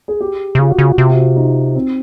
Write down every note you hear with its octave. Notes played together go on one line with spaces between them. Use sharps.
G#4
G4
C3
C#3 F4
F#4
C#3 F4
F#4
C3 F4
F#4
F4
D#4
C4